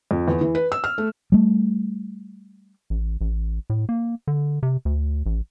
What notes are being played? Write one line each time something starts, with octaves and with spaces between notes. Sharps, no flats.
F2
E2
E3
B4
E6
F6
A3
G3 A3
A1
A1
A2
A#3
D3
C3
D2
A1